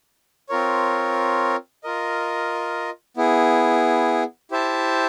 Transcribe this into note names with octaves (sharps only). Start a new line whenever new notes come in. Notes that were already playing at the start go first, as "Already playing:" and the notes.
C4 F4 A#4 C#5
F4 A#4 D#5
B3 E4 G#4
E4 G4 C5 E5 A5